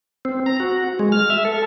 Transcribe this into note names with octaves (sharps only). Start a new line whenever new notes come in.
C4
A#5
F#4
G#3
F6
E5
A4